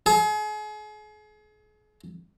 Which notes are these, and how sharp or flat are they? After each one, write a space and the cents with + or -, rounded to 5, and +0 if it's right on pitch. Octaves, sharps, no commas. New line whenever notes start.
G#4 +35